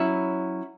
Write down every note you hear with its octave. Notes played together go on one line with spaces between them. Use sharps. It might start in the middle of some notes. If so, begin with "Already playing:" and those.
Already playing: F#3 C#4 E4